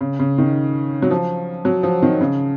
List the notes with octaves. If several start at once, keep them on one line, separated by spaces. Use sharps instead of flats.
C#3
C#3
D#3
F#3
F3
F#3
F3
D#3
C#3